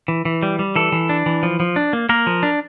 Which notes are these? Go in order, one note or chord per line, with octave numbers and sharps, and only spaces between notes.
E3
E3
G3
G3
E3 A4
E3
D4
E3
F3
F3
D4
A#3
A#3 A#4
F3
D4